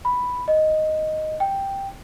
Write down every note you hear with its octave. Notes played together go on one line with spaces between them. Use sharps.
B5
D#5
G5